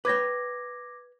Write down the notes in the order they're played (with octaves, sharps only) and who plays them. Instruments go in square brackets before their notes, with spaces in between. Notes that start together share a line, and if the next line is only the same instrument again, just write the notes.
[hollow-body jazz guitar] B4 C#5 G5 [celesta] D6 G#6 A#6